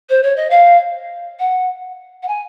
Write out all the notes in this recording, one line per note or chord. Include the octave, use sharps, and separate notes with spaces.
C5
C#5
D#5
F5
F#5
F#5
G#5